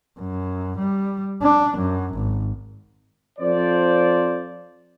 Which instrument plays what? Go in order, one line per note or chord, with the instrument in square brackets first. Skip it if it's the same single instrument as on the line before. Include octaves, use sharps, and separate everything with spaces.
[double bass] F#2
G3
D4
F#2
G#1
[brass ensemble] F2 F3 C5 D5